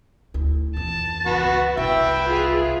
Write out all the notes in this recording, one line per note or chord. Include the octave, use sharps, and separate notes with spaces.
D2 E4
F2 E3 A5
C#2 F#4 B4
F#1 C2 B4 E5 G5
F4 G#4